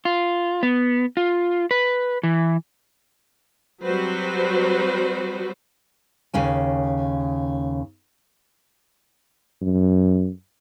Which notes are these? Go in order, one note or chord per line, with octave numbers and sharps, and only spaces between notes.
F4
B3
F4
B4
E3
F#3 G3 C4 F#4 B4 C5
D#2 C#3 C#4 G#5
F#2